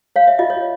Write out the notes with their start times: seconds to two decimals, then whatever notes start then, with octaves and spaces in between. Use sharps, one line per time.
0.16 C#5 F5
0.27 E5
0.39 F4 D#5
0.50 C#5